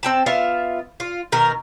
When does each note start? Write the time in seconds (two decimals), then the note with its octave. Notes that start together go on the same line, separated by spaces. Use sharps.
0.03 C4 G5 A5
0.26 B3 F4 E5 F5
1.00 F4
1.32 B2 D#3 A#4